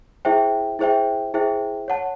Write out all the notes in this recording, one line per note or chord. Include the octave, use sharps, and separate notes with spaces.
E4 G#4 C5 E5 G5
E4 G#4 C5 E5 G5
E4 G#4 C5 E5 G5
C#5 F#5 A5